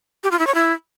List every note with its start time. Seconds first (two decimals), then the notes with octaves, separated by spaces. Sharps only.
0.24 G4
0.31 F4
0.39 E4
0.47 C#5
0.55 E4